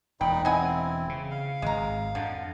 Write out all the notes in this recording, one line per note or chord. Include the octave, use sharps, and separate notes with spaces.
E1 A#2 D#4 G5 B5
C4 E4 D#5 F#5 G#5
C#3
F5
G#1 G#3 A#5
F2 D3